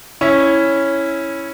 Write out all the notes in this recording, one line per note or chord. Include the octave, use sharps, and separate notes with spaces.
C#4 E4